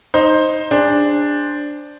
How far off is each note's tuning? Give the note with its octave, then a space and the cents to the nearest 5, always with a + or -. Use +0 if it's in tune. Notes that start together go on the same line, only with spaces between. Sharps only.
D#4 +0 C5 +10
D4 +0 G#4 -35 C5 +0